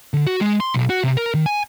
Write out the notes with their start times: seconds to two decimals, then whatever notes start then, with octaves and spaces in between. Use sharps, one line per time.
0.14 D3
0.27 F#4
0.41 G#3
0.60 C6
0.74 B1
0.89 F#4
1.04 C3
1.17 A#4
1.34 D#3
1.46 G#5